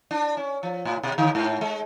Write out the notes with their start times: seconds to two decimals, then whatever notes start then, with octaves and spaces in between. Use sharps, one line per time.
0.11 D4
0.37 C#4
0.63 F3
0.85 A2
1.03 B2
1.18 D3
1.35 G#2
1.61 G#3